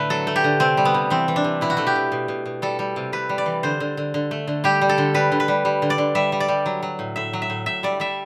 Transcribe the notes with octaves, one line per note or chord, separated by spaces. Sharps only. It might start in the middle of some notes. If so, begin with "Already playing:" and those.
Already playing: A2 D3 A3 B4
F#3 A4
A3
G4
D3
C3 C4
G3
B3
C3
E3 C4
E3
D4
C3
B2 E4
F#4
A3 E4
G4
B2
B2
B2
B2
G3 A4
G3
C3
C3 B4
G3
D5
E3
D3 C5
D3
D3
D3
A3
D3
G3 G4
G3
A4
D3
G3 B4
D3
B4
G3
G3
D3
D5
D3
G3 E5
G3
D5
G3
F#3
F#3
A2
A2 E5
F#3
E5
A2
A2 E5
G3 D5
G3 E5